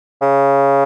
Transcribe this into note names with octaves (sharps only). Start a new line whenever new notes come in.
C#3